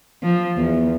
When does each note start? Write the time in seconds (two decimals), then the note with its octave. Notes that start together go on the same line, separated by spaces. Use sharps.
0.23 F3
0.57 E2